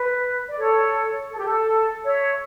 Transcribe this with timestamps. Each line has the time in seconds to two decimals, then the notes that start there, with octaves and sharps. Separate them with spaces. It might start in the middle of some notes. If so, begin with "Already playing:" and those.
Already playing: B4
0.47 D5
0.58 A4 C#5
1.30 A4
1.38 G4
1.46 A4
2.03 C#5 E5